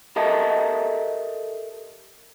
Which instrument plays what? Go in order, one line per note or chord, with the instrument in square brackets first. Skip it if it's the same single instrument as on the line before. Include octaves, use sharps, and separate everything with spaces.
[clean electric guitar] G4 A4 A#4 D#5 E5 A5